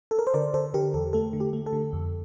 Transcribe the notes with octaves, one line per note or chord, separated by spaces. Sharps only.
A4
A#4
C5
D3 A#4 D5
D3 A4 C5
D3 G4 A#4
E2 A4
A3 A4
D3
G4
A3
A4
D3
F2